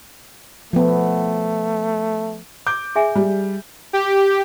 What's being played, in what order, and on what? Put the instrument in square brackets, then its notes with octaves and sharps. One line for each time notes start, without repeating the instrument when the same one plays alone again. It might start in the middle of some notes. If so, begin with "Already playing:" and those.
[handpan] F3 B3 [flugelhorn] A3
[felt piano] D6 G6
[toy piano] G#4 E5 G#5
[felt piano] G3
[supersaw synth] G4